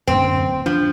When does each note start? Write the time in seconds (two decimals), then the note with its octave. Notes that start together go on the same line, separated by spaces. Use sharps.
0.07 D1 F#2 A#3 C4
0.66 F3 D4